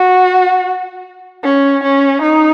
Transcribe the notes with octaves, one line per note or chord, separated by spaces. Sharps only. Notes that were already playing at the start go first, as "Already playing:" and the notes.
Already playing: F#4
C#4
C#4
D#4